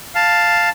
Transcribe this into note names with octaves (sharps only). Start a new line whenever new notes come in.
F5 A5